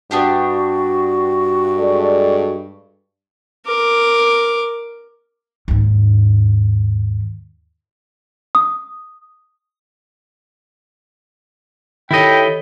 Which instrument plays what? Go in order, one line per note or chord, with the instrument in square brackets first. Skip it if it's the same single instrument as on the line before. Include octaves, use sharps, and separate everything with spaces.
[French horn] G2 [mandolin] B3 D4 G4 [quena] F#4
[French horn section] G#3 A4 D5
[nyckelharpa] A#4 D6
[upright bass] D#2 G#2
[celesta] D#6
[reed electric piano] D#3 [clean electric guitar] E4 D#5 [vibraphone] G4 A4 C#5 [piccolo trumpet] G5